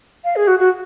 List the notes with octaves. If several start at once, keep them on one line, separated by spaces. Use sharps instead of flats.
F5
G#4
F#4
F#4